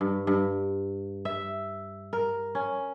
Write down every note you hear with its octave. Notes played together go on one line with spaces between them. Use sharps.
G2
G2
E5
A#4
C#4